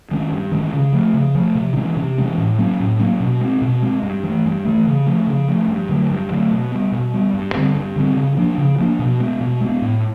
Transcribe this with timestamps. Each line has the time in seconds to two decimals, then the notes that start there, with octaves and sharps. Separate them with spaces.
0.11 D#3 G#3 C#4
0.32 G2
0.52 D#3 G#3 C#4
0.73 C#3
0.93 F3 A3
1.14 C#3
1.35 F3 A3
1.55 C3
1.76 E3 G#3 C#4
1.97 C3
2.18 E3 G#3 C#4
2.38 A2
2.58 F#3 A#3 C#4
2.80 A2
2.99 F#3 A#3 C#4
3.20 B2
3.41 G#3 C4
3.62 B2
3.82 G#3 C4
4.03 G2
4.23 E3 A3
4.45 G2
4.65 E3 A3
4.87 C#3
5.06 F3 A3 C#4
5.27 C#3
5.48 F3 A3 C#4
5.68 G2
5.89 D3 F#3 A3
6.11 G2
6.30 D3 F#3 A3
6.52 B2
6.72 G3 B3
6.92 B2
7.14 G3 B3
7.34 G2
7.55 D3 G3 C4
7.75 G2
7.96 D3 G3 C4
8.17 C#3
8.37 F3 A#3 D4
8.58 C#3
8.78 F3 A#3 D4
8.99 B2
9.20 G#3 B3
9.41 B2
9.61 G#3 B3
9.82 A2